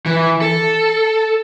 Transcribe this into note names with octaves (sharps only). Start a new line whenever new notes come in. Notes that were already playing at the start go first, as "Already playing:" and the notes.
E3
A4